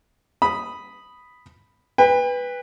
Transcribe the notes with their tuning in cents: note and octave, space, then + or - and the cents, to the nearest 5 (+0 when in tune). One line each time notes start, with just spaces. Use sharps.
B5 +0 D#6 +0
B4 +0 G5 +45